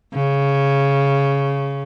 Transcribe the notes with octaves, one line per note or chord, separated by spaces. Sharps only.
C#3